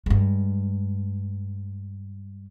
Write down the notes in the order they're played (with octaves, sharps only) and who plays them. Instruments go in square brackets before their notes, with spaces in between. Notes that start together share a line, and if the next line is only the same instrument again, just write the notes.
[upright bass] G2 G#3